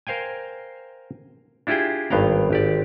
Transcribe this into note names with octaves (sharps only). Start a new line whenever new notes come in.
A#4 C5 F5 G5 G#5
D4 E4 F4 G4 G#4 G5
G#1 G2 B3 F5 G5 A#5
G#1 G4 D5